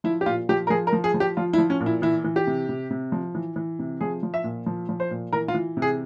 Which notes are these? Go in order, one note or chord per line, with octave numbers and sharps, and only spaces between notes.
F3 E4
G4
A#2 F4
F3 G4
A#4
F3 G#4
A#4
F3
G#4
F3
G4
F3 F4
E4
F3
C#4
A#2
E4
E3 E4
E3
G4
C3
C3
C3
F3
E3
E3
C3
F3 G#4
F3
E5
A#2
F3
F3
C5
A#2
E3 A#4
F4
E3
C3
G#4